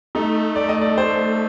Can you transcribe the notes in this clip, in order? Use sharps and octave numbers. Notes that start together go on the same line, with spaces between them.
A3 D#4
D5
D#5
D5
C5